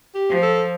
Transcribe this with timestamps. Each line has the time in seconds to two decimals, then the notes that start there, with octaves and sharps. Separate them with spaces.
0.15 G4
0.29 F3
0.43 A4